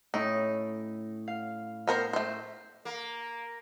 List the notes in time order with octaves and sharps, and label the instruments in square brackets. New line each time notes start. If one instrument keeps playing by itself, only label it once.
[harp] A2 C#4 E4 [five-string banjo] D#4
[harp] F5
[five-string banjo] B3 A#4 C5
A3 C5
[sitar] A#3